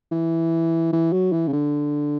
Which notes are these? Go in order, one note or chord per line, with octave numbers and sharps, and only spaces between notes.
E3
E3
F#3
E3
C#3
D3